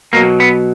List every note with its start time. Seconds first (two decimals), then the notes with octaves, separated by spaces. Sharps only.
0.13 B2 F#3 A#3
0.40 B3